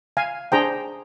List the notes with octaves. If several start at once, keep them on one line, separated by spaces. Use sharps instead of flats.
F5 G#5
D4 G#4 C5 G5 A#5